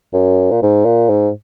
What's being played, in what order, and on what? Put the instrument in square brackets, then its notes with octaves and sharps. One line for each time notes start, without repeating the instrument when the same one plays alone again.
[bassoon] F#2
A#2
G#2
A#2
G#2